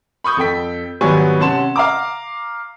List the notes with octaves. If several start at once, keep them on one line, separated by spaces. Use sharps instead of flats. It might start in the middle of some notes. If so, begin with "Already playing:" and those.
B5 C#6 D#6 G6
F2 A4 G5 B6
G#1 F#3 G3 B3 G#5 C#6
C3 C#4 F#5 A5 C6 E7
F5 A#5 D6